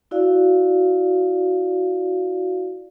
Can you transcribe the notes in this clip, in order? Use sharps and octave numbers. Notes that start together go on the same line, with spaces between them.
E4 F#4 D5 F5